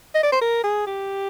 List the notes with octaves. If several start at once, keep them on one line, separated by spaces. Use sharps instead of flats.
D#5
D5
C5
A#4
G#4
G4